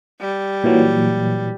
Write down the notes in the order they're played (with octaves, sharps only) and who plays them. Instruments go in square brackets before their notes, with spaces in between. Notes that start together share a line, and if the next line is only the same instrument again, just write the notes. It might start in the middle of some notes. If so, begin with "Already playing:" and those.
[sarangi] G3
[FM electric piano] A#2 E3 F#3